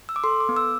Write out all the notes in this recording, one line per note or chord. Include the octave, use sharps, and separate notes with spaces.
E6
D6
A4 C6
D6
B3
E6